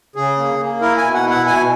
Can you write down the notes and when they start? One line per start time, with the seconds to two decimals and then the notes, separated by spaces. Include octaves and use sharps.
0.15 C#3 G#4
0.37 A#3
0.59 A#3
0.81 E4 A#4
0.97 G#5
1.03 B2
1.14 F#5
1.25 E4
1.31 F#5
1.47 B2 G#5